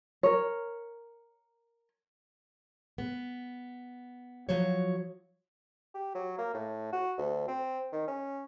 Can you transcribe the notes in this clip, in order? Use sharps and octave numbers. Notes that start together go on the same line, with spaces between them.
A#4 C#5
B3
F3 F#3 F#4 C#5
G4
F#3
A#3
A2
F#4
D2
C4
D#3
C#4